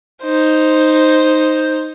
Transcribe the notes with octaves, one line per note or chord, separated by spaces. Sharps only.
D#4 C5